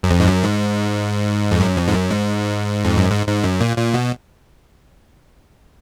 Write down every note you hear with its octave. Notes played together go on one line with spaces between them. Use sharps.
F#2
F2
G#2
F#2
G#2
F2
F#2
F2
G#2
F#2
G#2
F2
F#2
G#2
G#2
F#2
A#2
A#2
B2